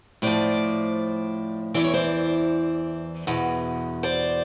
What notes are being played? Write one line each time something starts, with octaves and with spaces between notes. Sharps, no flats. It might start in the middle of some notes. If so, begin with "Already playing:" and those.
A2 F3 C5 D5
E2 C#3 E3 D5
C#5
C5 D5
E2 B2
C5 D5